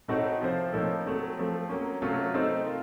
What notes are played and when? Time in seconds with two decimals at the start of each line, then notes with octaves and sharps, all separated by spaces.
0.08 A2 A3 C4 D#4 F#4
0.41 C3 F3 C4 F4 C5
0.73 A2 F3 A#3 D#4 A4
1.06 F#3 A3 C4
1.37 F3 A3 C4
1.69 F#3 A#3 C#4
2.02 C3 F#3 A3 C#4 F4
2.34 A3 C4 D#4 A4 C5
2.66 F4 A#4